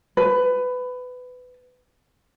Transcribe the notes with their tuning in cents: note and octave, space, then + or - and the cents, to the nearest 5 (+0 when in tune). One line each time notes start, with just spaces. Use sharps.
B4 +20